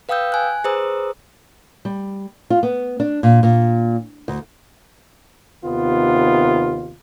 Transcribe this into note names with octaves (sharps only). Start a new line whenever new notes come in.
B4 F5 G5 D#6 E6 G6
G#5 F#6
G#4 B4 C5 A#5 D#6 E6
G3
F4
B3
D4
A#2
A#2
D2
D#2 C3 D#3 B3 F4